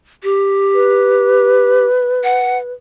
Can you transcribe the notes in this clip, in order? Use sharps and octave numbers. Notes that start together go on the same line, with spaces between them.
G4
B4
F#5